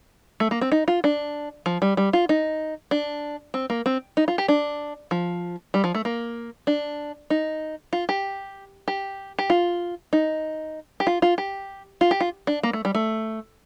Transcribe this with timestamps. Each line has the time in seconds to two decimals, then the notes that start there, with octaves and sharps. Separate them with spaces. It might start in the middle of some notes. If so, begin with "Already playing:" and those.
0.40 A3
0.51 A#3
0.61 C4
0.72 D#4
0.88 F4
1.04 D4
1.66 F3
1.82 G3
1.97 G3
2.13 F4
2.29 D#4
2.91 D4
3.54 C4
3.70 A#3
3.86 C4
4.17 D#4
4.28 F4
4.38 G4
4.48 D4
5.11 F3
5.74 G3
5.84 F3
5.95 A3
6.05 A#3
6.67 D4
7.30 D#4
7.93 F4
8.09 G4
8.88 G4
9.39 G4
9.50 F4
10.13 D#4
11.00 G4
11.07 F4
11.22 F4
11.38 G4
12.01 F4
12.11 G4
12.20 F4
12.47 D4
12.63 A#3
12.73 A3
12.85 G3
12.95 A3